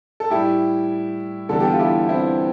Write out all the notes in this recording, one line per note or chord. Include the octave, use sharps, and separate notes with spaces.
A4
A2 G3 E4 G4
E2 D3 G3 A4
G4
F4
E4 G4
C4 E4